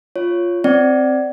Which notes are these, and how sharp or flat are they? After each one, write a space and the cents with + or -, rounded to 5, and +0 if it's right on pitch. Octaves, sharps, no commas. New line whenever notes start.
F4 +0 C#5 +0
C4 +0 D5 +0 F#5 +30